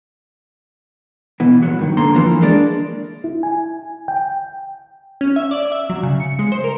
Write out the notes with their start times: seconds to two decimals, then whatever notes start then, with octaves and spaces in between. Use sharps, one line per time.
1.40 B2 E3
1.63 A#2 F#3
1.79 G2 D#3
1.97 D2 D3 A#3 A#5 C6
2.15 E3 F3 A#3
2.41 G#3 A#3 D4
3.24 E4
3.43 G#5
4.08 G5
5.21 C#4
5.36 E5
5.51 D5
5.72 E5
5.90 F#3
6.03 C#3
6.20 C#7
6.39 G#3
6.52 C5
6.64 A#4